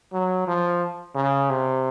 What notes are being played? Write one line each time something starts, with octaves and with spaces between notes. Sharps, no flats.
F#3
F3
C#3
C3